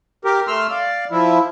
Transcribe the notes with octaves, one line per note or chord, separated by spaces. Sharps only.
G4 A#4
A3 C6 E6 F6
D5 F5
F3 E4